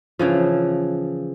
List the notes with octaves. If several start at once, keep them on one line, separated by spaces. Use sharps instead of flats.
C#3 E3 F3